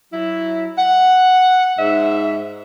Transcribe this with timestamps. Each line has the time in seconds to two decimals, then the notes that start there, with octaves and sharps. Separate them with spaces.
0.13 F#3 E4
0.78 F#5
1.79 G#2 E5